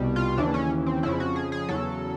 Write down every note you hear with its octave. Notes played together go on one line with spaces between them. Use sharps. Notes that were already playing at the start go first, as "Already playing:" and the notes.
Already playing: C2 B2 G3
F4
D#2 C#3 E3 D4
C#4
C4
F2 C#3 F3 E4
F#4
G#4
G#4
E2 C#3 F#3 A4